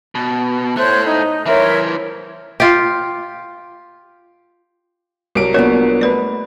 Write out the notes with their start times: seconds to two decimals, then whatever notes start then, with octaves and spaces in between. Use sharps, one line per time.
0.15 B2
0.77 A3 E4 C5 C#5 F#6
1.05 D#4
1.46 E3 A#4 C5 C#5 E5
2.60 F4 G4
5.35 C2 F#3 A#4 C#5 D7
5.54 A#3 B3 D4 F4 F#4 A#4 C#5 D5
6.01 A3 B4 D5 B5